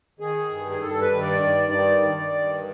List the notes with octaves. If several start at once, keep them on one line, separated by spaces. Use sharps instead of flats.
D#3 G#4
G2
G#4
G2 A4
B4
D#3
D5
G2
D#3
D#3
G2